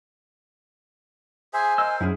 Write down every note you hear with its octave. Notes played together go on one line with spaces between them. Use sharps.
G#4 C5 E5 G#5
A#4 C5 D#5 F5 E6
F#2 E4 G#4